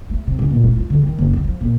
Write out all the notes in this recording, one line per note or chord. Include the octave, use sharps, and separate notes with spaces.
A3
C3
C#2
A#2
A3
F4
D3
D#3
F#1
D#3
F3
A#2